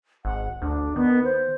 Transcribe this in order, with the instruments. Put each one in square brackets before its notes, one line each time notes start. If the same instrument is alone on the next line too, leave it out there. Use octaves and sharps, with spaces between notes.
[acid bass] G#1 [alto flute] F#5
[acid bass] D2 [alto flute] D4
[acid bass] D#3 [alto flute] B3
[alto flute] C5